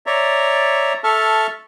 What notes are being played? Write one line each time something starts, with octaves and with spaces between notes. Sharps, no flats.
C#5 D5 E5 A#5
A4 E5 A5 C#6 F6